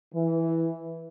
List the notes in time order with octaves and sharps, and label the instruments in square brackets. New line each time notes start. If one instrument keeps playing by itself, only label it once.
[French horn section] E3